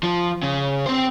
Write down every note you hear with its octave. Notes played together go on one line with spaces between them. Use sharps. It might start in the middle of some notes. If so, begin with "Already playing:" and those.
F3
C#3
C4 C5